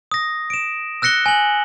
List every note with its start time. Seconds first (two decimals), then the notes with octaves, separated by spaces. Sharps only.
0.11 D#6 A#6
0.50 D7 E7
1.02 E6 F#6 A#6 C#7 G7
1.26 G#5 F#7